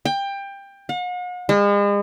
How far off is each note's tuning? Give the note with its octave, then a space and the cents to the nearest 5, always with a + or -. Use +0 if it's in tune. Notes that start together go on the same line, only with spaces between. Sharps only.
G5 +20
F#5 -45
G#3 -40